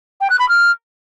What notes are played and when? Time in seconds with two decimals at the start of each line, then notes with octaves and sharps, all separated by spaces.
0.21 G5
0.30 F#6
0.39 B5
0.49 F6